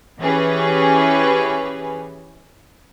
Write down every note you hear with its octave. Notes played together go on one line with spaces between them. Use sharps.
E3 C#4 G4 G#4 B4